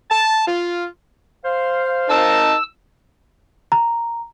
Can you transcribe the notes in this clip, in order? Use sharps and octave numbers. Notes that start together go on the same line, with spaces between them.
A5
F4
C5 F5
D#4 A#4 A5 E6
A#5